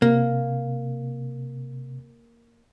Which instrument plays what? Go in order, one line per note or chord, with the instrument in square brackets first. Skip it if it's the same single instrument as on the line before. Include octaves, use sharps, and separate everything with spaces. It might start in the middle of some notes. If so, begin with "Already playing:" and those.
[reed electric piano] C3 [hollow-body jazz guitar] A#3